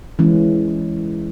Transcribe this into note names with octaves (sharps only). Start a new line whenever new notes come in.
E3 G#3 C#4